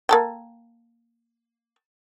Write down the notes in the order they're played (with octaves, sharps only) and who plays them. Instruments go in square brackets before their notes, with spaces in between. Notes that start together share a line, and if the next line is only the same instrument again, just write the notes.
[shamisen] A#3 A4 G5